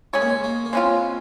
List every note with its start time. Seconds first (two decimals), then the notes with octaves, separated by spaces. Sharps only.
0.13 G#3 C#4 G#4 C#5
0.21 A#3
0.29 G#3
0.44 A#3
0.65 A#3
0.73 G#3 C4 C#4 F4